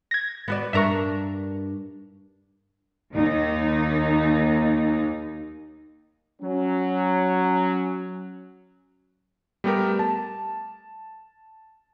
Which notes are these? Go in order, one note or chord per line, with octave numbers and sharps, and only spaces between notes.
G#6 A#6
B3 F#4 D5
G2 D4 A#4 E5 A#5 C#6
D#2 D#4
F#3 C#4
G3 A3 B3 G4 A#4
A5